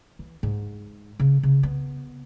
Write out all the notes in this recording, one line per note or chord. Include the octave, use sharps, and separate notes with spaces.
E3
G#2
C#3
C#3
B3